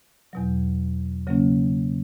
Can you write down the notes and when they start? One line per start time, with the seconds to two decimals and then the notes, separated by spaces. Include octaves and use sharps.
0.33 E2 B2 F#3
1.27 C#3 F#3 A#3 C#4